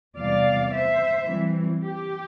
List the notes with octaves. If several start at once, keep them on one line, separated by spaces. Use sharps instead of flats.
E2 C3 G3 D5 F5
C5 E5
E3 G3 C4
G4